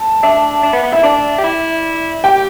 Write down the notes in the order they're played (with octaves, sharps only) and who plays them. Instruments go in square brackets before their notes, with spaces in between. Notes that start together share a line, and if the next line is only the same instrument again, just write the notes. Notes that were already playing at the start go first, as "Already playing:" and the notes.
Already playing: [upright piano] A5
[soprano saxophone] D4 [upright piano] E5
[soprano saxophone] D4
B3
B3
[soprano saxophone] E4 [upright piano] E5
[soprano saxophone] D4 [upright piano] D5
[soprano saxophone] G4
E4
[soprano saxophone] G4 [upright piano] G5